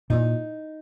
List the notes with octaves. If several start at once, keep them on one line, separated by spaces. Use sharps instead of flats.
A#2 D#4